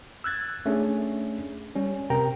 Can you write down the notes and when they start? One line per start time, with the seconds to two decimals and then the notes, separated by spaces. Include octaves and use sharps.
0.24 E6 F#6 G#6 A6
0.66 A3 C#4 D4 G#4
1.75 G3 C#4
2.10 C3 A#4 G5 A#5